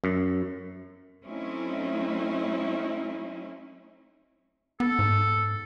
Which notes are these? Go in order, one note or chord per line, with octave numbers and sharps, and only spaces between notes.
F#2
F#3 A3 C4 C#4 D#4 E4
B3 A4
G#2